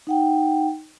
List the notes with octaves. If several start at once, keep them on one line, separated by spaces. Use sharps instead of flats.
D#4 F#5 G5